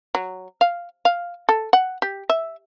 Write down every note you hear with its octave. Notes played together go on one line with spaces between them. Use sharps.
F#3
F5
F5
A4
F#5
G4
E5